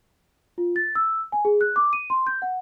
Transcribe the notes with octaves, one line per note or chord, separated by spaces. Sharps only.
F4
A6
E6
G#5
G#4
F#6
D6
D#7
C6
G6
F#5